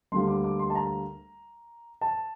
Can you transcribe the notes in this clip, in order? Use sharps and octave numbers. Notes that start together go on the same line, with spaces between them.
D2 D3 G3 A#3 C6
D6
D6
C6
A5
A#5
A5